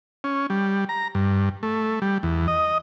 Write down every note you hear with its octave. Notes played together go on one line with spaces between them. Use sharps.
C#4
G3
A#5
G2
A3
G3
E2
D#5